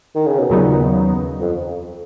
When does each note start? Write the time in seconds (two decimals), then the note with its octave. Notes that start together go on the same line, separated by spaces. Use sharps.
0.15 D#3
0.27 C#3
0.38 B2
0.50 D#2 A#2 C#3 F#3 B3 D#4
1.40 F2